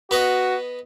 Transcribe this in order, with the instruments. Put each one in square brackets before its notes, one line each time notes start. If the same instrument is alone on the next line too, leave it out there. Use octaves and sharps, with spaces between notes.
[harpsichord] B3 B4 D#5 [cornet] F#4